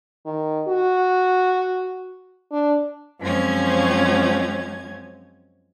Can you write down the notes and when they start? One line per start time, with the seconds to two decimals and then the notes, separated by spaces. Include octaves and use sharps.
0.26 D#3
0.68 F#4
2.52 D4
3.21 F#2 F3 G#3 C4 C#4 G#6